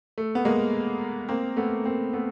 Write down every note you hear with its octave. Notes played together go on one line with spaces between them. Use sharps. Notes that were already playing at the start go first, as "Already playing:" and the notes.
A3
B3
G#3 A#3
A#3 C4
A3 B3
A#3 C4
A3 B3